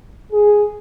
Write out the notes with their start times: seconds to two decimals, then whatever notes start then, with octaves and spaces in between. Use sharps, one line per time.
0.32 G#4